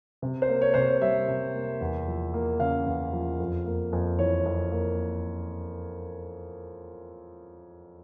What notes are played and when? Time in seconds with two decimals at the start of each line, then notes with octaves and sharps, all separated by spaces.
0.22 C3
0.42 C5
0.49 A#3
0.62 C#5
0.74 C3 C5
0.82 C#5
1.01 G3 E5
1.28 C3
1.54 A#3
1.81 E2
2.07 F3
2.34 A#3
2.60 C#3 F5
2.86 E2
3.13 F3
3.40 F2
3.66 A#3
3.93 F2
4.19 E3 C#5
4.46 F2
4.72 A#3